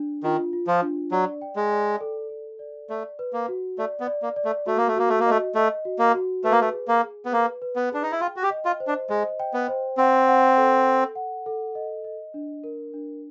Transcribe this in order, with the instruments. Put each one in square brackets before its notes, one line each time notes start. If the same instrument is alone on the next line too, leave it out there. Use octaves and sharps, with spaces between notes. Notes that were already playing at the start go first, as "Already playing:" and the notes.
Already playing: [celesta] D4
[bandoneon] D#3 [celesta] F4
[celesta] F4
[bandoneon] F3
[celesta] D4
[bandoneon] F#3 [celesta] D5
[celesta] G5
[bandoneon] G#3
[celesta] D5
A4
A4
D5
[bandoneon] A3 [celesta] D5
[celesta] B4
[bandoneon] A#3
[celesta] F#4
[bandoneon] A3 [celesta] D5
[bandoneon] B3
[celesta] D5
[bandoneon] A#3
[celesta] D5
[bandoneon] A3
[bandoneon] A3 [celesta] F#4
[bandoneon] A#3
A3
[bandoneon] A#3 [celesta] F#4
[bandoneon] A3
A#3
[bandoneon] A3 [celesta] D#5
[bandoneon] A3 [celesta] D#5
[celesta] F#4
[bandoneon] A#3
[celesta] F#4
[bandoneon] A3 [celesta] B4
[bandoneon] A#3
A3
[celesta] G#4
[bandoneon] A#3
[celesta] G#4
[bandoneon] B3
[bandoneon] A#3 [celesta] B4
[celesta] B4
[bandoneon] B3
[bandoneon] D4 [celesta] G#4
[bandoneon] D#4
E4
[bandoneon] F4 [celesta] G5
[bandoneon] F#4
G4
[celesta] D#5
[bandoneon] F4
[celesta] C5
[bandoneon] D4
[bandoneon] G#3 [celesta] D#5
[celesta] G5
[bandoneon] B3
[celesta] C5
[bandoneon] C4 [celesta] F#5
[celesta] F#5
A4
A4
F#5
A4
D#5
D#5
D4
A#4
D4